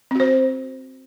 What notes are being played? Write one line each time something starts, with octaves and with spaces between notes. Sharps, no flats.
C4 F#4 C5